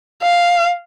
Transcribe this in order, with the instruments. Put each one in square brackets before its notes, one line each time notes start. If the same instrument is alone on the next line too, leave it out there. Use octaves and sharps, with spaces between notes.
[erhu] F5